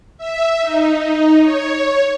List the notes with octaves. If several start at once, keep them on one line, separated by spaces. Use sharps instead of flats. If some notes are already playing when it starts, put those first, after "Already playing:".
E5
D#4
C#5